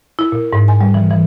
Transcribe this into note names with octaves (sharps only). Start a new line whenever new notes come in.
E4
A#2
G#2
G#5
G3
E3
E3